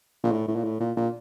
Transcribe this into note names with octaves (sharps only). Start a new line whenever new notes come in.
A#2
A2
A2
A#2
A2
A#2
A#2